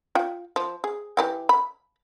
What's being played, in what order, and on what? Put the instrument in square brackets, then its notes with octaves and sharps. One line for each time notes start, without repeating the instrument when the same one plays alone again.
[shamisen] F4 G5
F3
G#4
E3 G4 G5
B5